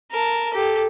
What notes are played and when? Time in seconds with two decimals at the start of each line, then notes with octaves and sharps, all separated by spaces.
0.11 A#4 A5
0.54 G4 A4